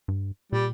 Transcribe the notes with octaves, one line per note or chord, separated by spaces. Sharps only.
G2
A#2 G3